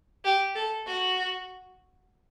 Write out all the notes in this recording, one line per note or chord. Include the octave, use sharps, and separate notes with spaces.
G4
A4
F#4